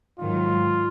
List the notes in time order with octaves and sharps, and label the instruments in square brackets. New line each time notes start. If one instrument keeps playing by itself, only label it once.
[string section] G#2 D#3 F#3 [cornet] F4